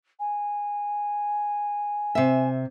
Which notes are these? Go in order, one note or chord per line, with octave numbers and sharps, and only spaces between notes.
G#5
C3 E5